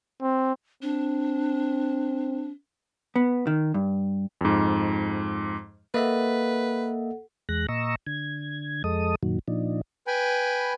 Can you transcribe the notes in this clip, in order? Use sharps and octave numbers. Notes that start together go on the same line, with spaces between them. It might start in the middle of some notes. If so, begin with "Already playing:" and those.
C4
C4 D4
B3
D#3
G2
F2 G#2
A#3 A4 B4 D#5 E5 F#5
E2 G#3 F#6 A#6
A#2 D#5 A#5 C#6 E6
D3 G#6
F2 G#3 A4 D#5 D#6
F#2 A#2 D#3 F#3
A#2 F3 D4 D#4
B4 G5 G#5 B5